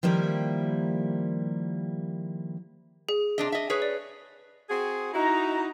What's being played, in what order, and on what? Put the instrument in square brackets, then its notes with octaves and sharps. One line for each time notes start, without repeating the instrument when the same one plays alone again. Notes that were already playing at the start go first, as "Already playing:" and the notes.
[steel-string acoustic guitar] D#3 F3 G3 A#3 E4 G4
[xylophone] G#4
[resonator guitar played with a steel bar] C3 D4 D#5
D#5 E5
G#4 B4 C#5
[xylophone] D5
[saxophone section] C4 F#4 G#4
[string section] D#4 A#5 [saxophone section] E4 F#4